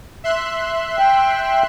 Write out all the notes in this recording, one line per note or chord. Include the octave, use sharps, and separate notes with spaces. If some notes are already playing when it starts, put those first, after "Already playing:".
E5 C6 F#6
G5